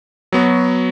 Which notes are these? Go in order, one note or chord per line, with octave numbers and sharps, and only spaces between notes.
F#3 B3 F#4